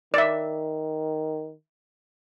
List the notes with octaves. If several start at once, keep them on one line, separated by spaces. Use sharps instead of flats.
D#3 D5 E5